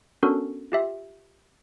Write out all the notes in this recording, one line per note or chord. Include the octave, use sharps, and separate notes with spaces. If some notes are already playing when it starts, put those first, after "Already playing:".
B3 C#4 D4 F#4 A4 A#4
F4 G4 E5